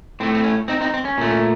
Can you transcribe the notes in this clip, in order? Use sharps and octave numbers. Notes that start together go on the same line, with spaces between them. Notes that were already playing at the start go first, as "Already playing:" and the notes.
A2 A3 C4
C4
C#4
C4 D#4
C4 D#4
C4
C#4
A#2 A3